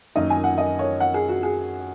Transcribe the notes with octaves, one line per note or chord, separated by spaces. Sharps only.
F#2 D#3 A#3 D#4 D#5
G#5
F#5
D#5
C#5
F#5
G#4
F#4
G#4